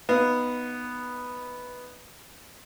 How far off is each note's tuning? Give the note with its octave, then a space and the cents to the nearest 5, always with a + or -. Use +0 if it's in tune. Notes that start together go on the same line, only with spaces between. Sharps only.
B3 +0 D#4 +0 F5 -20